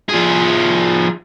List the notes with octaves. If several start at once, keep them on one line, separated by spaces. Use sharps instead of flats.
F3 G#4